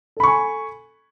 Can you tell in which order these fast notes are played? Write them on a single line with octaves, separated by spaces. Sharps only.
A4 B5 C#6 G#5